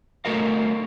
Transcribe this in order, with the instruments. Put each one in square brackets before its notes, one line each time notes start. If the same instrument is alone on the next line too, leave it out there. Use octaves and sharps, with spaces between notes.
[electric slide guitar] A3 F#4 A4 A#4 D#5 F5